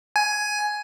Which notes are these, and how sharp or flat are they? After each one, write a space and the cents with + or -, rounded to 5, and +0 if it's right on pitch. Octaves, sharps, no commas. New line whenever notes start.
G#5 +10